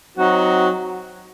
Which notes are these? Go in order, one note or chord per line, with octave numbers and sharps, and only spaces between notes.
F#3 C4 D#4 F#4